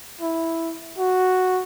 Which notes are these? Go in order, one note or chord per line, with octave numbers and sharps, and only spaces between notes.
E4
F#4